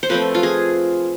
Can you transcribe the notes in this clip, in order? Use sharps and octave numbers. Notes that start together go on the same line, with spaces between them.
C5
F3 A3 C4 B4
F4
G#4